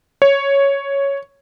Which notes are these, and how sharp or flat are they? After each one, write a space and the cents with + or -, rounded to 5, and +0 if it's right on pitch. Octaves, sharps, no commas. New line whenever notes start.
C#5 +0